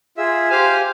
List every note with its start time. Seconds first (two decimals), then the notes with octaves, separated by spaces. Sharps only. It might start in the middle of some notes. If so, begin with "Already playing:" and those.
0.17 F4 G#4 E5
0.49 G4 C5 F5 G#5